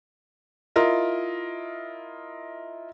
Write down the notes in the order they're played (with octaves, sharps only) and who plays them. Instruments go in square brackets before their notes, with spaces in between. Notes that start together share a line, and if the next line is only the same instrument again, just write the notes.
[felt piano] E4 F4 A#4 D#5